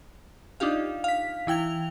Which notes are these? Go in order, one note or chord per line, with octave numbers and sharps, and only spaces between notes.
D4 D#4 F4 G4 F5
F5 B6
E3 E4 G5 G#6 F7